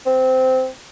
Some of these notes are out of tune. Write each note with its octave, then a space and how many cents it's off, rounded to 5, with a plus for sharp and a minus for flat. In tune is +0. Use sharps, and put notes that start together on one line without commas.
C4 -15